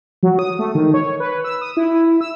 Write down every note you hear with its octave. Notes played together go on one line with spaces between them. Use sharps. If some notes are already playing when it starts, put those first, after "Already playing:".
F#3
D#6
A3
D#3
C#5
B4
E6
D#6
E4
E6